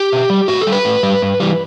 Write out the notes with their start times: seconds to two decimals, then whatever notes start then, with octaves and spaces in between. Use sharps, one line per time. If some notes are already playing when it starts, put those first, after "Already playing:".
Already playing: G4
0.12 B2
0.30 G3
0.48 A2 F#4
0.61 A4
0.67 G3
0.72 B4
0.85 A2
1.03 G3
1.22 G2
1.40 E3 G3